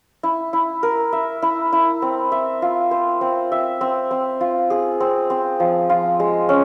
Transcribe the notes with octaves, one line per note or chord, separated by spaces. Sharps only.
E4
E4
A#4
E5
E4
E4
C4
E5
F4
C5
C4
E5
C4
C4
F4
G#4
C4
C4
F3
F4
G#3
C#4